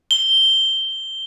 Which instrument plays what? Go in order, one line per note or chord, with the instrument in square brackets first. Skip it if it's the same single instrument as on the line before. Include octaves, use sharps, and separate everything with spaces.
[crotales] G7